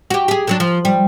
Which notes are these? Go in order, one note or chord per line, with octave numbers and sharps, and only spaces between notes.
F#4 G4
G4 G#4
D3 F#3 D4
F3
G3